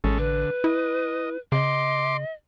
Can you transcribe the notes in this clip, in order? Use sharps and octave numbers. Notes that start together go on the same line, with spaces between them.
A1 G#3 C#4 A4
D3 B4
E4 D#5
C#3 D#5 C6 D6